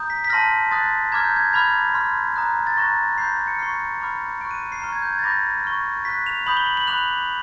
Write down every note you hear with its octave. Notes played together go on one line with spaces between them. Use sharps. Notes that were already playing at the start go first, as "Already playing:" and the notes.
Already playing: A#5 D#6 G6
B6
B6
A5 C6 F6 A#6
C6 D#6 F#6 A6
A#5 D6 F6 G#6
G6
G#6
B5 D6 F6 G#6
C6 F6
A#5 D#6 F#6
A6
A#5 C#6 F#6 A#6
B5 D6 G6 C7
C#7
C#6 F6 C7
B5 D6 F6
C#6 F#6 D7
D#7
C7
A#5 C#6 F6
G#6
G6
G#6
A6
B5 D6 G6 A#6
C#6 F6
C#6 F#6 B6
F7
B5 D#6 G6 F#7
G7
F#7
F#7
B5 D6 F#6 F7